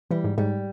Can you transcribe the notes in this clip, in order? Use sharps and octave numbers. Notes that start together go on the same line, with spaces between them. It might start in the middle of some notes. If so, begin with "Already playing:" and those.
E3 G3
G#2
G#2 G3